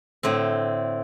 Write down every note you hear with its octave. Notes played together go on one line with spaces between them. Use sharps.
A2 D3 C4